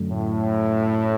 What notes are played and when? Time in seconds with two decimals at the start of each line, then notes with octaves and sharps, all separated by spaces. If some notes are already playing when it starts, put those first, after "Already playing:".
Already playing: F#2 D3 A3
0.10 A2